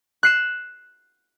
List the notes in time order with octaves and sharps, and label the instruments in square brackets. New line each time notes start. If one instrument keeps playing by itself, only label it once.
[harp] F#6 C7 E7